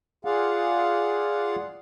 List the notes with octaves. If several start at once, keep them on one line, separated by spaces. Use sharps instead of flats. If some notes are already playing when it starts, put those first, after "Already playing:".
F4 G#4 D5 F5 F#5